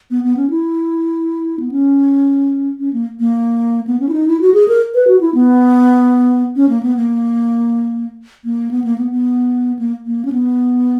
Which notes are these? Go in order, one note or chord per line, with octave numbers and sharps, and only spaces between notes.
B3
B3
C#4
E4
B3
C#4
C#4
A#3
A#3
B3
C#4
E4
D#4
E4
F#4
G#4
A#4
B4
F#4
E4
B3
C#4
A#3
B3
A#3
A#3
B3
A#3
B3
B3
A#3
A#3
C#4
B3